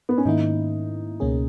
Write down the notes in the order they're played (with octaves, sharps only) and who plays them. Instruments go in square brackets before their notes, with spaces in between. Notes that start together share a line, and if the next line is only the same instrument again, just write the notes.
[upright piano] B3
C#4
[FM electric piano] G#2 D#3 A#3 E4 [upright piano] D#4
[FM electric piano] C#2 B2 A#3 C#4 G#4